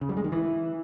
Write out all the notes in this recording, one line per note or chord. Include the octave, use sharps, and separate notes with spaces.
C#3
G3
G#3
D#3
E3